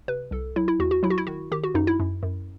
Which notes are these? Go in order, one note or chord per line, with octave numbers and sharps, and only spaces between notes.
C3 B4
C2 A4
F#3 E4
E4
E2 F#4
F#4
F#3 E4
F#4
E4
D#3 F#4
D#3 G4
F#4
F#2 D#4
E4
F#2
F#2